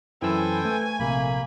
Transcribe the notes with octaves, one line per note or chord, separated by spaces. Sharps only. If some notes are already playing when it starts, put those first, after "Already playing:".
F#2 E3 E4 A4 C5 G5 G#5 E6
A3 B4
A#1 C3 A#3 B5